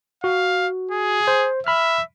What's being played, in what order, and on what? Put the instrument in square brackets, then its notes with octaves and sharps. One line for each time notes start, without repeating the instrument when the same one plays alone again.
[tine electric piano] F#4 [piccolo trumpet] F5
[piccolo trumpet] G#4
[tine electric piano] C5
[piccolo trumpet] E5 [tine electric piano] B5 F6